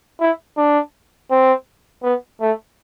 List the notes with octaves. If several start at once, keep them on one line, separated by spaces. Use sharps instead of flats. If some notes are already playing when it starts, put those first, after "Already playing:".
E4
D4
C4
B3
A3